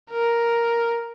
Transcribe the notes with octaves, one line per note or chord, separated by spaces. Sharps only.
A#4